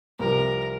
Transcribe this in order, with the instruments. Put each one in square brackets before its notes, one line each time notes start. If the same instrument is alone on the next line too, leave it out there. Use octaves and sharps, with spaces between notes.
[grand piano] C2 C3 F3 [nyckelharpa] A#4